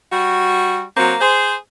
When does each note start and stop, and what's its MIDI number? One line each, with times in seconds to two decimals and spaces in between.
0.12 0.83 55
0.12 0.83 66
0.97 1.15 54
0.97 1.15 58
0.97 1.15 60
1.21 1.54 68
1.21 1.54 72